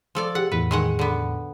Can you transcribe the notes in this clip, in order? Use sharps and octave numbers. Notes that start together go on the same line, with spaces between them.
F3 A4 D5
G4 G#4 F#5
E2 A2 B4
D#3 G#3 F#5
D3 B3